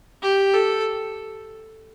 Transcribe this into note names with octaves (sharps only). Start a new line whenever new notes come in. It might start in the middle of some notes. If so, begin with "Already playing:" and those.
G4
A4